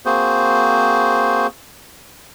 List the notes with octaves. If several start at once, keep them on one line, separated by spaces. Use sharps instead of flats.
A#3 C4 F#4 G#4 C5